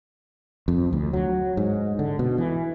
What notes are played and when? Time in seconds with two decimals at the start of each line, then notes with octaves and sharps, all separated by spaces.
0.68 F2
0.93 D2
1.13 F#3
1.57 G#2
1.99 D3
2.19 B2
2.38 E3